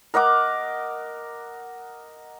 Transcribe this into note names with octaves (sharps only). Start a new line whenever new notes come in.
A#4 D#5 F#5 D6